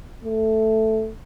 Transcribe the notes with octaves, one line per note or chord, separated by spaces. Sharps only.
A3